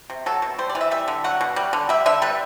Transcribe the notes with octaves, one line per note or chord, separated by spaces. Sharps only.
C3
F#3 A4
B2
G3 C5
D5
E3
E5
G3 E5
D3
F#3 F#5
B2
G3
D3
G3 E5
D3 E5
G3 B4